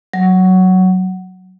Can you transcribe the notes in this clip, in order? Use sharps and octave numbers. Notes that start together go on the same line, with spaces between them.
F#3